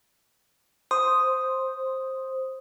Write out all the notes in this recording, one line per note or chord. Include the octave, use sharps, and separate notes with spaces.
C5 D#6